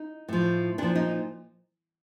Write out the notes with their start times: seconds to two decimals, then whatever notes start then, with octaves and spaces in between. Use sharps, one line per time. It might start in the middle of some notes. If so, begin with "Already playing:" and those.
Already playing: D#4
0.28 A2 F3
0.78 A#2 F3 D4
0.95 D#4